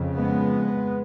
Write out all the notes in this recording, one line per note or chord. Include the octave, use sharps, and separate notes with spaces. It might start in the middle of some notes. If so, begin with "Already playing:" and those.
Already playing: F2 C#3
G#3 B3